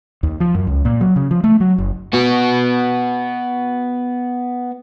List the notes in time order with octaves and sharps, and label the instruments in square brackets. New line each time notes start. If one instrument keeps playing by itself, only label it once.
[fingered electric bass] D#2
F3
F#2
C#2
A#2
F#3
C#3
F3
A3
F#3
F#1
[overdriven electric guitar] B3 F#4